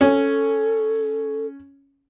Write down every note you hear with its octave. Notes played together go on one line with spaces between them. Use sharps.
C#4 A4